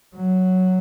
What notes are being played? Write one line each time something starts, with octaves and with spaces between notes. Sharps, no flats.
F#3